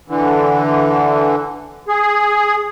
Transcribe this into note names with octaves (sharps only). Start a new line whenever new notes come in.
D3 E3
G#4